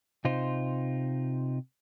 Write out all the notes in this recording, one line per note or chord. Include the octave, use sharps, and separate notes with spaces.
C3 D#4 F4 C5